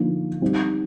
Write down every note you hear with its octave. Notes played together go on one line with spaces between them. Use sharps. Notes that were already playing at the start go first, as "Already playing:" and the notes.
Already playing: D3 F3 A#3 D#4
G3 C4 D#4